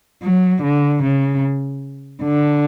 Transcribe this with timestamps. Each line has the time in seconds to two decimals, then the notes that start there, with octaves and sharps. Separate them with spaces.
0.23 F#3
0.63 D3
1.03 C#3
2.23 D3